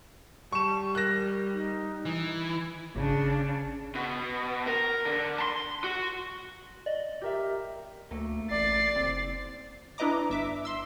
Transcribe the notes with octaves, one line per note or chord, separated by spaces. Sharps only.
G3 A5 C#6 E7
A#4 F#6 A#6
D#4
E3
G#1 C#3 D4
B2
A#4
D3
A5 C6
F#4
D5 D#5
G4 A#4 E5
D2 A3 A#3
A1 D5 A6 C7
F#1 C4
D4 E4 B4 D#5 A#5 D6
G1 E5 D6
C6 E6